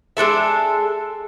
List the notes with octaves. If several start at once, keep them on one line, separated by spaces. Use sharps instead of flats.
G#3 D4 A4 E5